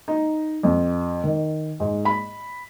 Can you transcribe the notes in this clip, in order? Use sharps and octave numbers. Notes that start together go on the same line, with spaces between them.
D#4
F2
D#3
G#2
B5